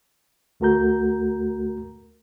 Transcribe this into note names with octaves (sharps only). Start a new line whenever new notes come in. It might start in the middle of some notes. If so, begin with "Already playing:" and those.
D2 A3 F#4 A#4 A#5 G6